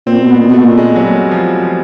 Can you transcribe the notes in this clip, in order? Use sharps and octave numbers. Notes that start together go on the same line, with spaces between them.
A#2 C4
B2
A#2 B3
B2
A3
A#2
G#3
F#3
G3
F3
F3